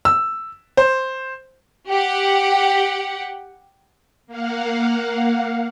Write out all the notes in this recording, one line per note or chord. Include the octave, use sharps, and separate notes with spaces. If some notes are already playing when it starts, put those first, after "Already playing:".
E6
C5
G4 F#5
A#3 F5 F#5